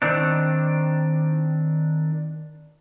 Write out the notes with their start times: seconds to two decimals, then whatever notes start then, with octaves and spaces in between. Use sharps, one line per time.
0.02 D#3 C4 D4